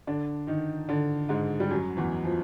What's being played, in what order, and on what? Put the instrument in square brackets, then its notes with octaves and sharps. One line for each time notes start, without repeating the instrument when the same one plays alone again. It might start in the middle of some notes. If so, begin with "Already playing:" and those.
[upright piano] D3 D4
D#3 D#4
D3 D4
G#2 G#3
G3
F#2 F#3
E2 E3
F3